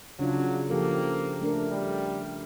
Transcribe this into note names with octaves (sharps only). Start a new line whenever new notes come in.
C#3 F#3 D4 F4
F3 A#3 G4 A4
A3 D4 A#4
G3